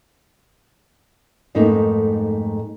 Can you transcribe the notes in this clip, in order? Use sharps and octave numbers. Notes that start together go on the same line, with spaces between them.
F2 G#2 A3 A#3 D#4